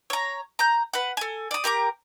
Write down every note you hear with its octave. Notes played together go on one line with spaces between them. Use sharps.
C#5 A#5
A#5 G6
B4 F#5
A4 G#5
D5 D#6
G4 A#4 A#5 D6